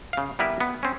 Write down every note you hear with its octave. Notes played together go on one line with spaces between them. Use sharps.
C#3 F5
G3 B3 E4 A#4 B4
B3
C4 C#4